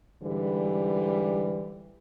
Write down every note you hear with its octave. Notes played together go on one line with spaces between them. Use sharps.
G#2 D3 E3 G3